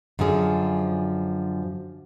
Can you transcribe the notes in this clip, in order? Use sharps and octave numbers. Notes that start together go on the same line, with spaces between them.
F#2 D3 F3 G#4